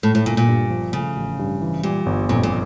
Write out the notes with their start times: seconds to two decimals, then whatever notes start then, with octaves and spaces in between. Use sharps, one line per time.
0.03 A2 A3
0.15 A2
0.26 G1 A#2
0.37 A#2
0.49 G2
0.70 F3
0.93 C#3 A3
1.16 A1
1.39 G2
1.62 E3
1.83 A#2 G3
2.06 G1
2.29 F2 A#2
2.43 A#2